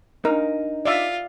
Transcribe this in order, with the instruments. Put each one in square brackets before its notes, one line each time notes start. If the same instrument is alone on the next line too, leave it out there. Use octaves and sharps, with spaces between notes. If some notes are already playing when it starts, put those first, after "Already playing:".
[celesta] D4 D#5 [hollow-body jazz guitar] D#4 [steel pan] A#4
[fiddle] F4 [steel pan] D5 E5